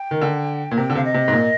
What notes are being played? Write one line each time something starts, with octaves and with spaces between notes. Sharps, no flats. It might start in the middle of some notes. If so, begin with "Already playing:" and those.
Already playing: G5
D#3
D3
A#2
C3 G5
D3
C3 F5
D#5
C3
G#2
A#2